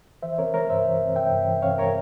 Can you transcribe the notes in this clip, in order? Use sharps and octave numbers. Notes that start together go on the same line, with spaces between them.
E3 C5 E5
C4 A#4 C#5
G#3 A#4 C#5
G2 C5 E5
E3
C4
G#3 E5 G5
G2
E3
C4 C#5 F5
G#3 A#4 C#5